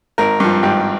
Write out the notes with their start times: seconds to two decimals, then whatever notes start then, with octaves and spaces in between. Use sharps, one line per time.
0.18 G#1 A#4
0.40 G2 F3
0.63 G#1 G4